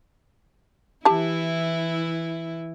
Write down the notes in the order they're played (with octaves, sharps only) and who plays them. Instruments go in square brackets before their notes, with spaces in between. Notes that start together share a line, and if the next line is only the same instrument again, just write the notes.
[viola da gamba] E3 E4 [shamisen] G4 A5